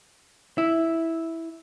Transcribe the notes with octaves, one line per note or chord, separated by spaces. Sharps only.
E4